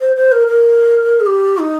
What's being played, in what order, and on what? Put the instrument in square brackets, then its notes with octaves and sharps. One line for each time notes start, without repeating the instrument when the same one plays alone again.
[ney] C5
C5
A#4
A#4
G#4
G4
D#4